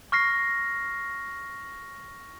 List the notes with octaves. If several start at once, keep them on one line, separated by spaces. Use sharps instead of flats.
C#6 F6 A#6 C7